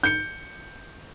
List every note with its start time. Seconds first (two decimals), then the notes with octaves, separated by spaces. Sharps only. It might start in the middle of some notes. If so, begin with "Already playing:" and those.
0.03 G6 C#7